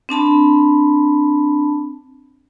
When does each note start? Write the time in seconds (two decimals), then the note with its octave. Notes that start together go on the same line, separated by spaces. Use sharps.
0.09 C4 D4 A5 B5